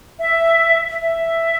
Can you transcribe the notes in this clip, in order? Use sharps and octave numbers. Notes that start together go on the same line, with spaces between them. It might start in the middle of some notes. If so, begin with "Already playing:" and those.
E5
E5